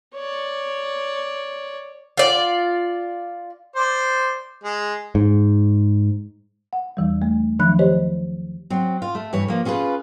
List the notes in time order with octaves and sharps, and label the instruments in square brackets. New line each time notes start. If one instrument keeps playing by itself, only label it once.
[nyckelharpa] C#5 D5
[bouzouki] F4 D5
[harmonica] C5 D5
G#3
[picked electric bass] G#2
[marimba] F#5
E2 E3 G3
A3
D#3 F3 F#3 D4 B5 F#6
G4 C5 C#5 D#5
[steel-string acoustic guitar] F#3 C4
F4
A3
G2 E3 B4 C#5
F3 A#3
C#4 F4 G#4 A4 B4